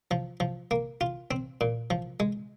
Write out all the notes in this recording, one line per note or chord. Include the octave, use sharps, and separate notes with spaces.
F3
F3
A#3
F4
C4
A#2
F3
G#3